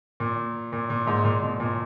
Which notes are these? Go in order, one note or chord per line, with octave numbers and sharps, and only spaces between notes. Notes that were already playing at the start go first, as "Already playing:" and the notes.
A#2
A#2
A#2
G#2
A#2
B2
A#2